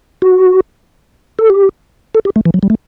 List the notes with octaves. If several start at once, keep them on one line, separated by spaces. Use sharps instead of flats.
F#4
A4
G4
A4
G4
A3
E3
F#3
G3
A3